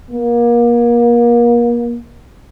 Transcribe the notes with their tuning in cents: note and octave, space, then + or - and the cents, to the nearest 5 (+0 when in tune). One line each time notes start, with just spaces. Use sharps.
A#3 +35